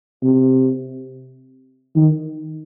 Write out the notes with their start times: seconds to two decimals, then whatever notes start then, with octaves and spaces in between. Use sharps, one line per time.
0.23 C3
1.96 D#3